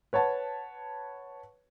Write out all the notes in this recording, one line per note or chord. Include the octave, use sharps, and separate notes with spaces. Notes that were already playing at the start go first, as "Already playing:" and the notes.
B4 C#5 F#5 A5